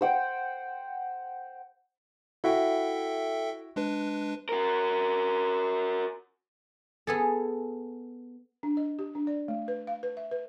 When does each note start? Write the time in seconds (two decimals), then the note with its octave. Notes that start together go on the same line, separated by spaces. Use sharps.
0.01 C5 F#5 G5
2.44 E4 F#4 A4 E5 G5
3.76 G#3 D4 B4
4.49 F#4 A#4
7.07 B3 G#4 A4
8.63 D4
8.77 D#5
8.99 G4
9.15 D4
9.27 D5
9.48 A3
9.68 B4
9.87 F5
10.03 B4
10.17 E5
10.32 B4